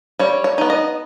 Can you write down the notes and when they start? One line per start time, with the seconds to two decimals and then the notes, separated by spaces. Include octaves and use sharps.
0.19 G3 C#5
0.44 C#5
0.58 B3 D#4
0.70 D#5